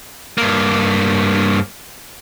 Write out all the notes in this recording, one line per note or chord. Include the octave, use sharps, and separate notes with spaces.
G2 A#3